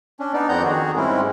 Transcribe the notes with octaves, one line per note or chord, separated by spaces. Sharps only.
C#4 D4
B3 D4 D#4 D5
F2 B3 C4 F#5 A#5 G6
D#3 F#4 G#4
G#2 G3 G#3 C4 C#4 E4